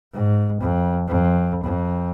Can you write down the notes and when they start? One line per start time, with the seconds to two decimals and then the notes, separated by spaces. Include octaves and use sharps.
0.13 G#2
0.61 F2
1.08 F2
1.64 F2